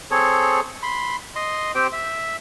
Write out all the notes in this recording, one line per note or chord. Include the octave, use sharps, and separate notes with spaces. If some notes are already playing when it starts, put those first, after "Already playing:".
C4 G#4 A4 C#5
B5 C6
D#5 C6
C4 G4 C5 G5
E5